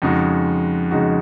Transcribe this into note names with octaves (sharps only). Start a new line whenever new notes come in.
F2 C#3 G#3 D#4 F#4
F2 C#3 G#3 D#4 F#4